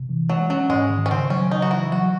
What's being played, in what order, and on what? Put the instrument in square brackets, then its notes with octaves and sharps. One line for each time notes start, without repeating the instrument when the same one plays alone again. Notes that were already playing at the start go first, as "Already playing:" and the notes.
Already playing: [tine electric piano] C3
E3
[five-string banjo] F#3 [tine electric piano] G#3
[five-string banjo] F#3 [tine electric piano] C#4
[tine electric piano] G#2 [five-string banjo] G#3
[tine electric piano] D#3
[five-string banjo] C#4
[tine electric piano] C#3 [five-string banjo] C4
[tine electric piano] F#3 [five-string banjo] C#4
[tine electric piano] C#3 [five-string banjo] D#4
[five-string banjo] F#4
[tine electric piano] E3 [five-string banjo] E4
[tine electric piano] F#3 [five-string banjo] F#4